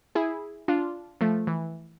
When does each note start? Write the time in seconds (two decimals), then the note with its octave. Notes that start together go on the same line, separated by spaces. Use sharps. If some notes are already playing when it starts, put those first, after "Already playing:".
0.15 E4 G#4
0.68 D4 F4
1.21 F3 A3
1.47 E3